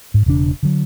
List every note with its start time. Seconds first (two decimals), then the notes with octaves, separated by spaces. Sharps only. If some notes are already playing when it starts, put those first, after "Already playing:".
0.14 G#2
0.26 E1 C#3 D4
0.63 D3 F#3